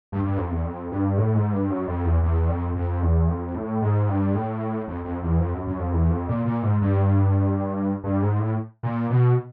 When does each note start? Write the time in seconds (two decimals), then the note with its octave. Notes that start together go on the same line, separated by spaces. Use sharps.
0.12 G2
0.25 G2
0.38 F2
0.51 E2
0.64 F2
0.92 G2
1.18 A2
1.35 G#2
1.53 G2
1.70 F#2
1.87 F2
2.05 E2
2.23 E2
2.49 F2
2.76 F2
3.02 E2
3.29 F2
3.55 A2
3.82 G#2
4.09 G2
4.35 A2
4.88 F2
5.04 F2
5.23 E2
5.39 F2
5.54 F#2
5.67 F#2
5.79 F2
5.93 E2
6.10 F2
6.29 A#2
6.45 A#2
6.63 G#2
6.81 G2
8.04 G2
8.22 G#2
8.39 A2
8.83 A#2
9.10 B2